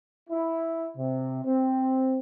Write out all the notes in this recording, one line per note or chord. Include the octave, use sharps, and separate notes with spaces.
E4
C3
C4